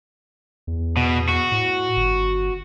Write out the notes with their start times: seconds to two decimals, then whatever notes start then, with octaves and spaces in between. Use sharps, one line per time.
0.67 E2
0.97 B2
1.29 F#4
1.52 A2
1.96 G1